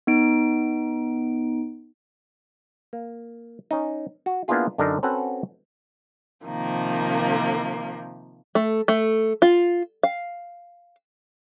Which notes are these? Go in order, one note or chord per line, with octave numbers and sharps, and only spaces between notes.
B3 D#4 D7
A#3
C#4 D#4
F#4
A#3 B3 D4 E4 F4 G#4
F#2 D3 D4 D#4 A#4
C4 C#4 F#4 A4 B4 F#5
C3 D#3 F3 A#3
A3
A3
F4
F5